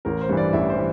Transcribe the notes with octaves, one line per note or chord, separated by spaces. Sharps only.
A1 A#4
C5
G2 E3
D5
A1 E5
C5
E3